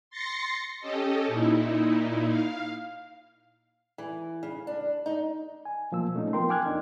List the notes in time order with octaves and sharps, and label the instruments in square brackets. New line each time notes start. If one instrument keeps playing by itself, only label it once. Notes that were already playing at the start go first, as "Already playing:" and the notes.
[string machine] C6 A6 A#6 C7 C#7
C#4 G4 A4 D#5
A#2 D#4 E4
F5
[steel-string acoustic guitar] E3
C#3
D4
D#4
[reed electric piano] G#5
B2 F3 A#3 E6
A#2 A3 C#4 D#4
F3 B3 F4 A#4 G5 C6
G5 G#5 D6 F6 F#6 G#6
F2 D4 D#4